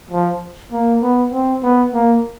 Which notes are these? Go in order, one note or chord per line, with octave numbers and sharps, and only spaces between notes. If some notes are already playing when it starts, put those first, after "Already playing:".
F3
A#3
B3
C4
B3
A#3